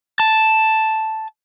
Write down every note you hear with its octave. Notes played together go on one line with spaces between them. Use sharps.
A5